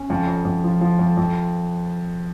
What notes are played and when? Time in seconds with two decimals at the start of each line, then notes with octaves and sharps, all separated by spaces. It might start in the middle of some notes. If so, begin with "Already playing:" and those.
Already playing: C#4
0.10 F2
0.27 F2
0.45 F2
0.64 F3
0.81 F3
0.99 F2
1.17 F2